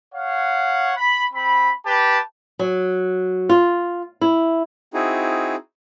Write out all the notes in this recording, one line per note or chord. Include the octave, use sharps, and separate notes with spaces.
C#5 F5 F#5
B5
C4 B5
G4 B4 A5
F#3
F4
E4
C4 D#4 E4 F#4 G#4